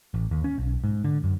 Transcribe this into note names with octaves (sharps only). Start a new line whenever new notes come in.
A1
D#2
C#4
B1
G#2
D3
F#2